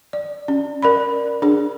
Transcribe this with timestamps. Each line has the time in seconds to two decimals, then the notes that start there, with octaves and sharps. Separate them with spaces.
0.13 D5
0.48 C#4
0.82 A#4 D5 B5
1.42 D4 G#4